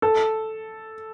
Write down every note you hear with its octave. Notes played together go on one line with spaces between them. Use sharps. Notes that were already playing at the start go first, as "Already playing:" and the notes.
A4